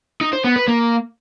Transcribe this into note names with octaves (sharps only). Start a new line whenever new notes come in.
D#4
C5
B3
B4
A#3